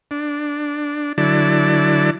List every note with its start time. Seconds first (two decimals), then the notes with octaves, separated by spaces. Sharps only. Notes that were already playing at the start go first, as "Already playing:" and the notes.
0.11 D4
1.18 D3 F#3 E4 A4 D5